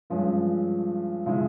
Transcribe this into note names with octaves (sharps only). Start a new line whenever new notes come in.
G2 F3 G#3 C#4
C#3 F3 G#3 E4